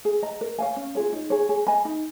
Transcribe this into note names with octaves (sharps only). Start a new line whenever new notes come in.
G#4
D#5 A#5
A#4
C#5 F5 G#5
C#4
F4 G#4 C#5
D#4
G#4 C#5
G#4
D#5 G#5 B5
D#4